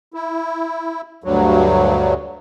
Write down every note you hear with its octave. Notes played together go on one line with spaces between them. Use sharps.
E4
D2 G2 F#3